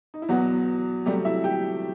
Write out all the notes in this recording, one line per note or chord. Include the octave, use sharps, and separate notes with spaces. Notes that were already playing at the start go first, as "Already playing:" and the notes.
D#4
E4
E2 B2 F#3 B3 F#4
C3 F#3 G3 A3 G4
E4 E5
G4 G5